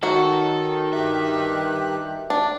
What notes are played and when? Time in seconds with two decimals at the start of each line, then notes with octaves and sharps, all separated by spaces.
0.03 D#3 F#3 F#4 A4
0.93 G2 G4 E5 F#6
2.30 D4